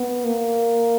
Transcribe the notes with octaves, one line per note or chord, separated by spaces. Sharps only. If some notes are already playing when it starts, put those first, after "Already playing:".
Already playing: B3
A#3